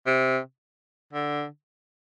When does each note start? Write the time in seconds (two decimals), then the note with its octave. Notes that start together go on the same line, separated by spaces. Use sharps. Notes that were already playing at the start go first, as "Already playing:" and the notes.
0.07 C3
1.13 D3